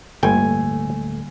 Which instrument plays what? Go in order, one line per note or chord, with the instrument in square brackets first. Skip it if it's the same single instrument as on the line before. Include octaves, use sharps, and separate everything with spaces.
[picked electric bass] D1 A3 [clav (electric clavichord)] G1 G5 [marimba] D3 G3 A#3 [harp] G#5